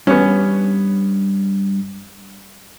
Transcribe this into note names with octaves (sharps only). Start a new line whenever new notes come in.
G2 B3 C#4